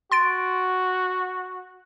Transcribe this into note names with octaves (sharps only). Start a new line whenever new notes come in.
F#4 C6 A6 D7